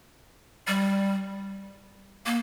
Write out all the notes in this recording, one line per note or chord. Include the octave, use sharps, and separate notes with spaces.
G3
A#3